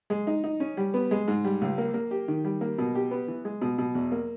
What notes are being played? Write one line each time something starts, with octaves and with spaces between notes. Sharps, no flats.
G#3
D#4
D#4
C#4
G3
B3
G#3
G#2
G3
C#2
A#3
A#3
G4
D#3
G3
A#3
B2
G4
B3
E3
G#3
B2
B2
E2
A#3